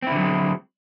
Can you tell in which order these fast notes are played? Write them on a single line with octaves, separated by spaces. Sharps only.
C4 E4 D3 F#3 G#3